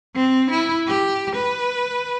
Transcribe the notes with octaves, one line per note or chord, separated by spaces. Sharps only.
C4
E4
G4
B4